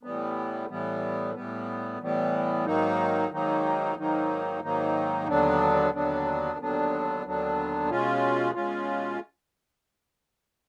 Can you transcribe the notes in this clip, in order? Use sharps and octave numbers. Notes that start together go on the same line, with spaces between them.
A2 E3 G3 B3
A2 E3 G3 B3
A2 E3 G3 B3
A2 E3 G3 B3
G#2 D#3 F#3 A#3 D#4
G#2 D#3 F#3 A#3 D#4
G#2 D#3 F#3 A#3 D#4
G#2 D#3 F#3 A#3 D#4
D#2 D3 F#3 B3 D4
D#2 D3 F#3 B3 D4
D#2 D3 F#3 B3 D4
D#2 D3 F#3 B3 D4
B2 G#3 C#4 F4
B2 G#3 C#4 F4